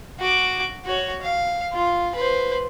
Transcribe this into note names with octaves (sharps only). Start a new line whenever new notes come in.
F#4 D6
F#4 C#5
F5
F4
B4 C5